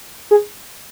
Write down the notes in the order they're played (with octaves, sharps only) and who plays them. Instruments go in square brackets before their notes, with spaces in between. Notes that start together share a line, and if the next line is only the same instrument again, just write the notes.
[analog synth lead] G#4